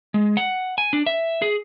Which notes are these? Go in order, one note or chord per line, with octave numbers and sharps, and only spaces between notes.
G#3
F#5
G#5
D4
E5
G#4